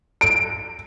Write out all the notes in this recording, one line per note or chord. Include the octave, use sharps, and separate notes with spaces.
D7